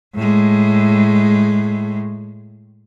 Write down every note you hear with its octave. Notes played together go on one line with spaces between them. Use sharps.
A2 G#3